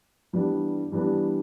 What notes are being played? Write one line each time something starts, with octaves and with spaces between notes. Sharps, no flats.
G2 E3 G3 B3 D4
G2 E3 G3 B3 D4